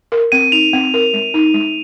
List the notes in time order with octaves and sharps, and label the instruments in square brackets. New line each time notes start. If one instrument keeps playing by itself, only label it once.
[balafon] A#4
[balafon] C4 [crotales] D#7
[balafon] D#4 [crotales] F7
[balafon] C4
A#4
G#3
D#4
G#3